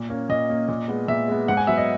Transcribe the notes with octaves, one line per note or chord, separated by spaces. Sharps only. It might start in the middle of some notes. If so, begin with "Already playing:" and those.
Already playing: A#2
A#3 C#4
A#2 D#5
A#3 C#4
A#2
G#3 B3
A#2 E5
G#3 B3
G#2 F#5
G#5
F#3 B3 E5
D#5